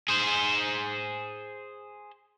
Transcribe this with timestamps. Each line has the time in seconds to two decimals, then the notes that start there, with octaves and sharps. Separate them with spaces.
0.08 G#4 C5